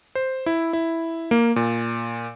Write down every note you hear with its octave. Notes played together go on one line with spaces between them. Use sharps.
C5
E4
E4
A#3
A#2